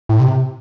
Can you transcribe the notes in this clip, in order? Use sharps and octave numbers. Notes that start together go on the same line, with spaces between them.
A2
C3